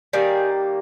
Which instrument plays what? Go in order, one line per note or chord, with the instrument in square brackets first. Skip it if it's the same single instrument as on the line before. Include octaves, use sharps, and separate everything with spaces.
[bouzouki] D#3 G3 A#3 G#4